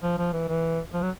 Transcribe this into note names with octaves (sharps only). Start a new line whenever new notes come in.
F3
F3
E3
E3
F3
F#3